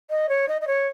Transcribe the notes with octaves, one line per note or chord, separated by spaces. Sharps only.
D#5
C#5
D#5
D#5
C#5